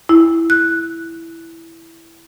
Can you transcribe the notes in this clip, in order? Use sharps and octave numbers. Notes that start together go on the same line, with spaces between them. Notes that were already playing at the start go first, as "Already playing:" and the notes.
E4
F#6